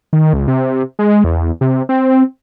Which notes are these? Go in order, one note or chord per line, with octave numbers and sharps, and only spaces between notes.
D#3
C#2
C3
G#3
E2
C3
C4